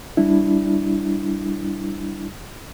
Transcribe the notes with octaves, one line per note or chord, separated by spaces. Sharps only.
G3 D4 E4